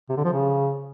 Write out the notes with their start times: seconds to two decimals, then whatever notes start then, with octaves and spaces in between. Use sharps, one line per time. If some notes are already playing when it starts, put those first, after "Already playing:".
0.09 C3
0.17 D3
0.25 F3
0.32 C#3